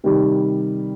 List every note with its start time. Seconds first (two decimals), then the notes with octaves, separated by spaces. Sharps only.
0.04 C3 D#3 G3